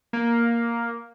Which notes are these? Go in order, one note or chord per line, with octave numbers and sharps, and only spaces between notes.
A#3